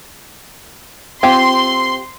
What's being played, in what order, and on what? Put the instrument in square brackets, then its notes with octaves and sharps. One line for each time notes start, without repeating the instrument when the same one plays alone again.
[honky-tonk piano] C4 [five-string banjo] F4 G4 G#5 [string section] C6